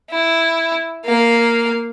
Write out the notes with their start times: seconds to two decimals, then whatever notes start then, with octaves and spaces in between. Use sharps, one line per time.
0.10 E4
1.05 A#3 F5